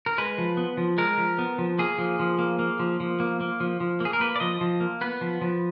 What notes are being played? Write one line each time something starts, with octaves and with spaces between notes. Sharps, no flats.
A#4
G#3 B4
F3
B3
F3
G#3 A#4
F3
B3
F3
A#3 G#4
F3
F3
A#3
A#3
F3
F3
A#3
A#3
F3
F3
A#3 G#4
A#4
A#3 B4
D5
F3 D#5
F3
A#3
B3 B4
F3
F3